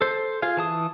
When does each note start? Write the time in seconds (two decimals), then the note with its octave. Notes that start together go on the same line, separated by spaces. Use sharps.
0.01 A4 C5
0.42 F4 G#4 F5
0.57 E3 A5 D#6